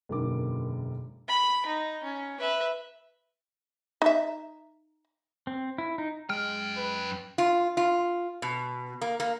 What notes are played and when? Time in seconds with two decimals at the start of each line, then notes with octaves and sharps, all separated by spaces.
0.09 E1 F#2 D3 D#3 A#3 D6
1.28 B5
1.66 D#4
2.03 C#4
2.40 B4 E5
4.02 D#4 E5
5.47 C4
5.78 E4
5.98 D#4
6.30 F#2 G#3 G5 F6
6.77 B4
7.38 F4
7.77 F4
8.42 B2
9.01 A#3
9.20 A#3